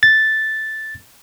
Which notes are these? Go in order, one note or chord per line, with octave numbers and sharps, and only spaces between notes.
A6